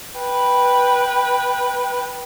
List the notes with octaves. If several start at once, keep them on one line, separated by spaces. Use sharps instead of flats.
B4 G5